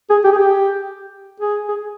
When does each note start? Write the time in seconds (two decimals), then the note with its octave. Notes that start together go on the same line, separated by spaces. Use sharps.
0.10 G#4
0.24 G4
0.32 G#4
0.38 G4
1.40 G#4
1.68 G#4